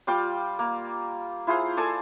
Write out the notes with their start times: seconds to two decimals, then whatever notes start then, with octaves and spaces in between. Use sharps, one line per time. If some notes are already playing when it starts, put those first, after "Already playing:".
0.07 G3 F4 G5 D6
0.59 A#3
1.47 E4 F4 G#4 C5
1.77 A4 D5 G#5 A5